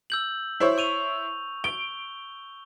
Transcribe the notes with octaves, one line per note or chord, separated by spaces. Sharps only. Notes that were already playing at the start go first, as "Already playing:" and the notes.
E6 G6 F#7
E4 C5 C#5
C#6 D#7 F7
D7 G7